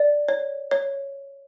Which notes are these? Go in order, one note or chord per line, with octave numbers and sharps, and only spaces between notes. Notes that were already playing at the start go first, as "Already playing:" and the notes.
Already playing: D5
C#5
C#5